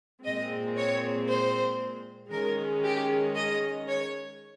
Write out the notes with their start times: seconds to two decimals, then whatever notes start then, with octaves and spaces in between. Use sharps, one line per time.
0.24 A#2 G#3 C4 D#5
0.76 C#5
1.28 C5
2.31 D#3 G#3 C#4 A#4
2.84 G4
3.35 D#5
3.88 C#5